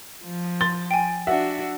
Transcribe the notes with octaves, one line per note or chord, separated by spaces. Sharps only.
F3
C6 A6
G5 G#5
D4 F#4 E5 F#5